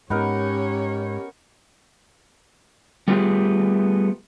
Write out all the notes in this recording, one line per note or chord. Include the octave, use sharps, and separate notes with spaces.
G#2 B3 C#4 D#4 G4 A#4 C#5
G3 A3 B3 F4 G4 G#4